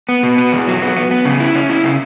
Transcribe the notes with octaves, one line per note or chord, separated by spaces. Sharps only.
B3
B2
B3
E2
F#3
B3
B3
B3
C#3
E4
C#4
E4
C#3